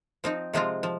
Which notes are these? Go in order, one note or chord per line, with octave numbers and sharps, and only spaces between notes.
F3 C4 D#4
C3 F3 G#3 C4 F4
F3